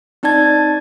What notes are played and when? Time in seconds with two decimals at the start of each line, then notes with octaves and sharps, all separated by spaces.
0.23 C4 D#4 D5 A5 G#6 A6